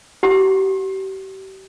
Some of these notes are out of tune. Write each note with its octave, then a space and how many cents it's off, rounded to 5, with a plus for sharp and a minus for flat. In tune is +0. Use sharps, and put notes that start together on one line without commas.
G4 -35